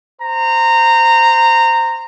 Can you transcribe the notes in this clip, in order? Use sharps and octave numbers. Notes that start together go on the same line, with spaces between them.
C5 A#5